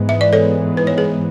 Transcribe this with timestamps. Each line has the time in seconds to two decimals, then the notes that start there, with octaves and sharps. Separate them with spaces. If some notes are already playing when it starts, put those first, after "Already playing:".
Already playing: G#2 E3 G#3 B3
0.09 E5
0.21 D5
0.33 A4 C#5
0.77 B4
0.87 C#5
0.98 G#4 B4